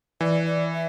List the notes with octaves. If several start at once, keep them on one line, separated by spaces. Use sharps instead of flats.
E3 D5
D5
E5